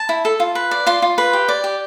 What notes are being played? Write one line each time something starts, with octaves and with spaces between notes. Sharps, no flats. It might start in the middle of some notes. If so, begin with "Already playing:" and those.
Already playing: A5
E4
A4
F4
B4
D5
F4 C6
F4
B4
G4
D5
G4